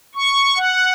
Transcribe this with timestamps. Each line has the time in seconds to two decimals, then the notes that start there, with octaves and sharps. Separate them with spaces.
0.15 C#6
0.57 F#5